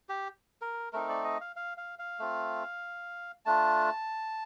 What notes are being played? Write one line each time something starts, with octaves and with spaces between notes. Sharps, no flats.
G4
A#4
A3 C4 D#4 A#4
D5
D#5
F5
F5
F5
F5
A3 C4 F4
A3 D4 F4 A5